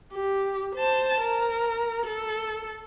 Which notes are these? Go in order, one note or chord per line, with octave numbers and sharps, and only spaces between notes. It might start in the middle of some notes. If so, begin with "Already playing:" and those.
G4
C5 A5
A#4
A4